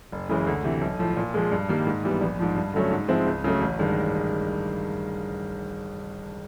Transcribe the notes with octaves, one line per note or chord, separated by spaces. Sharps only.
F#1
F#2 C#3 E3 G#3
D2
C3 E3
B1
A2 F3
A#2
F3 G#3
G2
D#3 G3 A#3
G#2
E3 G3 B3
A#1
G#2 F3
G2
D3 F#3 A3 C#4
G#2
F3 G#3 C4 E4
C#2
C#3 F#3 A3
A1
G2 D#3 G#3